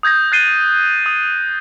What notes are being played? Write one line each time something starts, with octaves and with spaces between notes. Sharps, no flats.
D#6 G6 G#6 A#6
F#6 A6 C7 D#7 G7
D#6